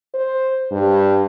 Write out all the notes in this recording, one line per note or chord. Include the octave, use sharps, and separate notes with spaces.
C5
G2